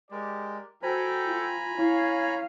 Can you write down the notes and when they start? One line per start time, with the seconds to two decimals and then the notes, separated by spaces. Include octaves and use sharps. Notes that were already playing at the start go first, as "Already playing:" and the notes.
0.11 G#3 G4 A#4 D5
0.83 F#4 A4 C5 G5 G#5 A#5 B5
1.26 F4
1.78 C#4 E4 C#5 F5